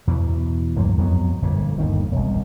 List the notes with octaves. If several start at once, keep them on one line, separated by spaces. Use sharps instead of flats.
E2 B2 E3
C#2 G2 F3 A#3
F2 F#3 G#3 B3
G1 F2 A#2
G1 D#2 D#3
E1 C2